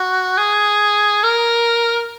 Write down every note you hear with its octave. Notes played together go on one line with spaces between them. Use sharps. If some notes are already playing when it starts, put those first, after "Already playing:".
Already playing: F#4
G#4
A#4